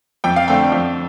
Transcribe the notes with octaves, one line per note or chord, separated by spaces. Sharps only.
F2 G5
F5
D3 A3 C4 G5
F2